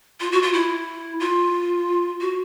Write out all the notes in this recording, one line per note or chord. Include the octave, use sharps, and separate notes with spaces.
F4
F#4
F4
E4
F4
F#4